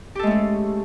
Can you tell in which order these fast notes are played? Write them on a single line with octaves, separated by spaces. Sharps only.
G4 A4 G#3 A3 C#4